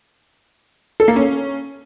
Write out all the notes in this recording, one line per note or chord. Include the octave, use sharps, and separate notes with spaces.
A4
A#3
C#4